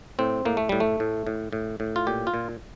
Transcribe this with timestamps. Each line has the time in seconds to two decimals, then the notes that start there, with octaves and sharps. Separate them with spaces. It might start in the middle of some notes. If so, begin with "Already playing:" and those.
0.19 A2 C4
0.45 A2 A#3
0.57 A3
0.69 A2 G3
0.80 A3
1.00 A2
1.27 A2
1.53 A2
1.80 A2
1.96 F4
2.07 A#2 G4
2.27 F4
2.34 A#2